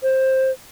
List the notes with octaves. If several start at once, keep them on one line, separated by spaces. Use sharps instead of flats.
C5